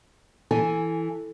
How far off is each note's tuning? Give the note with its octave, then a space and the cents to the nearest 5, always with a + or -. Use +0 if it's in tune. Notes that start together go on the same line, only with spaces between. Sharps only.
E3 +0 A4 +0 G#5 +0